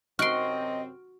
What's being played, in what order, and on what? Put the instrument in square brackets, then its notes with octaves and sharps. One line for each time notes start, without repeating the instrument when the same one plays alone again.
[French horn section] F#2 C3 C4 [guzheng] F#4 C6 [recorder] D#5 [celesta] F6 D7